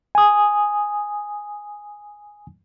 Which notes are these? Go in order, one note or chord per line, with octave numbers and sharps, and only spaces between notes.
G#5 D#6